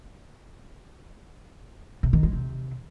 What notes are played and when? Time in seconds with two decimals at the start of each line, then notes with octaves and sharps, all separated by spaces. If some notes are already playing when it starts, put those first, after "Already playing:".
2.03 C3
2.13 D#3
2.23 G#3
2.33 C3